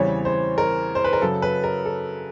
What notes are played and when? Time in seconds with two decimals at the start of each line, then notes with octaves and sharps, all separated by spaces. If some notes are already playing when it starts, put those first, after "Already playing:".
Already playing: E2 C#3 E3 G3 C4 C#5
0.25 C5
0.58 A#4
0.95 C5
1.04 B4
1.13 A#4
1.22 F#2 C#3 F#3 A4
1.42 B4
1.64 A#4
1.85 A4